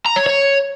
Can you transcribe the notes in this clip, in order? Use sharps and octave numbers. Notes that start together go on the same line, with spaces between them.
A#5
C#5
C#5